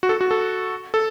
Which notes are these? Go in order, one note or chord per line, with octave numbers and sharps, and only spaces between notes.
F#4
A4
F#4
A4
A4